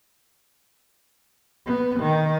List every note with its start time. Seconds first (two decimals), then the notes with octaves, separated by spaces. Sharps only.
1.66 B3
1.99 D#3